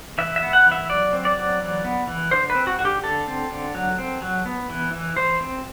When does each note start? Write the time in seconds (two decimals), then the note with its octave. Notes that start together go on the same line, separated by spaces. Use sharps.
0.18 E3 E5
0.36 E5
0.42 B3
0.53 F#5
0.66 E3
0.72 E5
0.89 F#3 D5
1.13 C4
1.25 D5
1.36 F#3
1.61 E3
1.85 B3
2.07 E3
2.31 D3 C5
2.50 B4
2.55 C4
2.67 F#4
2.79 D3 F#4
2.85 G4
3.03 D3 A4
3.27 C4
3.50 D3
3.75 F#3
3.98 C4
4.22 F#3
4.46 B3
4.70 E3
4.93 E3
5.16 E3 C5
5.41 C4